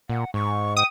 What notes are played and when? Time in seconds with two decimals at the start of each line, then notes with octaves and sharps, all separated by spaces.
0.10 A#2 F#5
0.34 G#2 C#6
0.77 G5 D#6